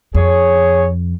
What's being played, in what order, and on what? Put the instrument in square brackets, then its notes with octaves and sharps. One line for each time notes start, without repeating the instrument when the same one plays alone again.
[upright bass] F2 [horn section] G#4 C#5